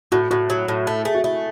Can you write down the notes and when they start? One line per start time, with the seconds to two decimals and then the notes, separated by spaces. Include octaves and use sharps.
0.12 A2 F#4
0.31 A2 F#4
0.50 F#3
0.68 A2
0.87 A3
1.05 A3 G#4
1.15 F#4
1.24 A3 E4